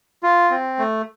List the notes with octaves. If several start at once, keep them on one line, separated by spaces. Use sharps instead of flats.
F4
C4
A3